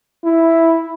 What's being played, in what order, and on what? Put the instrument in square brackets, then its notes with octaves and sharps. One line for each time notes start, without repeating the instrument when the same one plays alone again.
[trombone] E4